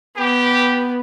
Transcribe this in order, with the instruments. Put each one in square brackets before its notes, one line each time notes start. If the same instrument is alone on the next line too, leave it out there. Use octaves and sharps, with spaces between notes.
[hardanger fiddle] B3 [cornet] G4